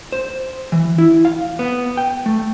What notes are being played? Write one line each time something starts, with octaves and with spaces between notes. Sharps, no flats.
C5
E3
E4
F5
B3
G5
A3